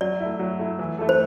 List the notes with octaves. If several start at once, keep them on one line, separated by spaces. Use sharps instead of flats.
F#3 D5
A3 E4
F#3
A3 E4
E3
A3 E4 A4
C5